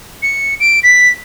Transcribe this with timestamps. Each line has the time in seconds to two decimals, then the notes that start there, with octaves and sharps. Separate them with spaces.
0.22 C#7
0.60 D7
0.83 B6